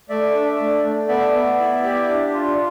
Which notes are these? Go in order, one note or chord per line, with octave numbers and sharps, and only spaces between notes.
A3 D5 E5
D4
A3
A3
B3 D5 E5
B3
E4
G4
D4
F4